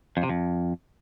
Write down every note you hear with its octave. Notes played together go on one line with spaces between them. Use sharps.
F2
C3
F2